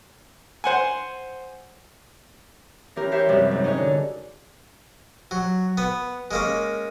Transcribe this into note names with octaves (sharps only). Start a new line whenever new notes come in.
C5 F#5 G#5
E3 C#4 G4 A#4
G4 C5 C#5 E5
F#2 C3 E3 F3 G3
G#2
C#4 D#4 F#4 G#4 C#5
D3
F#3
B3
G#3 A#3 C#4